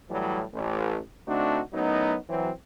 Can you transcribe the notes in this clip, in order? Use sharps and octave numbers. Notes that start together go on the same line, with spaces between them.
A2 E3 F#3 G3
A1
D3 A3 C4 D4 D#4 F#4
F#2 A2 F#3 B3 D#4
E3 F#3 C4